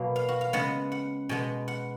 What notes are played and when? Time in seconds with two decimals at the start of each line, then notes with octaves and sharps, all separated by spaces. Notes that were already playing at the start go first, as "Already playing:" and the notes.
Already playing: B2 F#3 A#3
0.16 F5
0.28 F#4
0.41 F5
0.53 C#3 G#3 B3 F#5
0.92 F#5
1.29 B2 G#3 B3 G#5
1.68 F#5